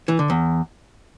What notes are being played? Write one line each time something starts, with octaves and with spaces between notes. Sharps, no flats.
E3
D3
E2